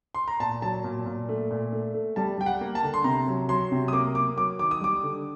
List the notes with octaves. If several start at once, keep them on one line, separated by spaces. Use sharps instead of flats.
C6
A#5
A#2 A5
F#3 A5
A#2
A#2
A3
A#2
A3
A3
G3 A5
G3 G5
F#5
A#3
A5
D3
C6
C3 A#5
F#3
F#3 C6
C3
D#6
A#3 D6
A#3 D6
F#3 D6
D#3 D6
D#6
G3 D6
D3